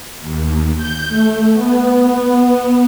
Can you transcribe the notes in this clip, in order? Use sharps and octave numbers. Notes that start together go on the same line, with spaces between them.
D#2
G6
A3
B3